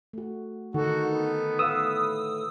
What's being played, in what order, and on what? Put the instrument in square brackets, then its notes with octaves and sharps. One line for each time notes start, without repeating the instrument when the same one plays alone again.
[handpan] A3 F#4
[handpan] D3 D#3 [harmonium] D#4 A4 [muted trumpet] F#4
[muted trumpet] B3
[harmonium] A2 [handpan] B4 F5 [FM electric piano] D#6 E6